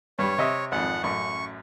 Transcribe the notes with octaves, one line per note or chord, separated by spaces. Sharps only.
G2 G3 C#5
C3 D#5 E5
G#1 F2 F#5
A1 F#2 C#6